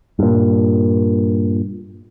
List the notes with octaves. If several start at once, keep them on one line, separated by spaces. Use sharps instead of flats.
G2 A#2